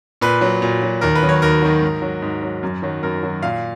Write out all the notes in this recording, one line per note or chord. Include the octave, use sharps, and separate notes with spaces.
A#2 B4
F#3
A#2
F#3
D#2 A#4
B4
D#3 F#3
C#5
D#2 A#4
D#3 F#3
G#2
F#3
G#2
F#3
F#2
D#3 F#3
F#2 A#4
D#3 F#3
A#2 F5